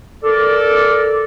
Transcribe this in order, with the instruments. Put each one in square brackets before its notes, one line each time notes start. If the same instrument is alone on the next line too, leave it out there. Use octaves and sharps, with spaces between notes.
[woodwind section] A4 A#4 D5